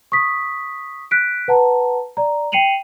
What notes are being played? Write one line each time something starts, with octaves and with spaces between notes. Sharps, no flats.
C#6 D#6 B6
F#6 B6 D7
B4 F#5 A5 A#5
D5 A#5
G5 C7 C#7 D#7 F7 F#7